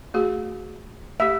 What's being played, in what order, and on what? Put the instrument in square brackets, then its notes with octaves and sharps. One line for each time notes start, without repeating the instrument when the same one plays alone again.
[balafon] A3 F#4 G#4
[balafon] A3 G4 [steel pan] E5